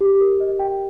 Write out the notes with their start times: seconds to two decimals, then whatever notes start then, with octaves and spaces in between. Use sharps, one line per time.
0.01 G4
0.21 A#4
0.40 D#5
0.59 G5